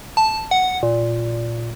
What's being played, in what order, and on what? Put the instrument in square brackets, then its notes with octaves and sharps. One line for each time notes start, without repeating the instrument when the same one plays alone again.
[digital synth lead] A5
F#5
A#2